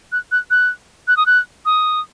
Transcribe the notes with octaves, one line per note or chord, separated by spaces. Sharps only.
F#6
F#6
F#6
F#6
D#6
F#6
D#6